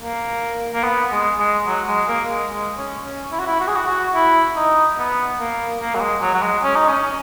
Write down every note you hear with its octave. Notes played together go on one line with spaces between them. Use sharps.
A#3
A#3
B3
G#3
G#3
F#3
G#3
A#3
G#3
G#3
C#4
C#4
E4
F#4
E4
F#4
G#4
F#4
F#4
E4
D#4
B3
A#3
A#3
F#3
G#3
F#3
F#3
G#3
C#4
D#4
C#4